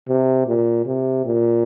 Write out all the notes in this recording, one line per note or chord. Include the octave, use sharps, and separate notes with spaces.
C3
A#2
C3
A#2